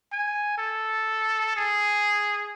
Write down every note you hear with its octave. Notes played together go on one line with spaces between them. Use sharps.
G#5
A4
G#4